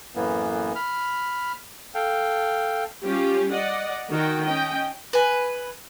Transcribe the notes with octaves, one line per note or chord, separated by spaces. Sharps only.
F#2 A2 E3 A#3 B3
B5 F6
A4 F5 G5
G3 C#4 F4 G4
D5 D#5 F#5
D#3 F#4 G5
C#4 D#5 G5
B4 G#5